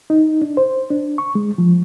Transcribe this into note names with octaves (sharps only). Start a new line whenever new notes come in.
D#4
D4
C5
D4
C#6
G#3
F3